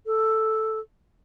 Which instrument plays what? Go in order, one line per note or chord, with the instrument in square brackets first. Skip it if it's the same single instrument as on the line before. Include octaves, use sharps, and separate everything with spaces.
[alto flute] A4